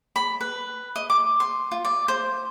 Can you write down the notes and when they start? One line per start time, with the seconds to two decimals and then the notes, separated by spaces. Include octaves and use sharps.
0.16 B5
0.41 B4
0.96 D#5
1.10 D6
1.40 C6
1.71 F4
1.85 D5
2.08 C5